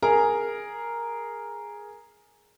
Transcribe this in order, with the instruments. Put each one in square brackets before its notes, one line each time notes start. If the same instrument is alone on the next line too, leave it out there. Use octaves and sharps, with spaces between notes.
[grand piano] G#4 A#4 A#5